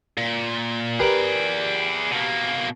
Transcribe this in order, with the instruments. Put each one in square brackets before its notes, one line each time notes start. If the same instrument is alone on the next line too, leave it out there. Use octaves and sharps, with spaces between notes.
[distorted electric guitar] A#2
[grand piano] G4 A#4 B4 [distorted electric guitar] G#4 D5
[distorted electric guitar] B2 A#3